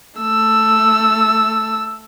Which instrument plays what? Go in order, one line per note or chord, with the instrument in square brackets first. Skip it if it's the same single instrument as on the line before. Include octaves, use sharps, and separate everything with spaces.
[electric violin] A3 E6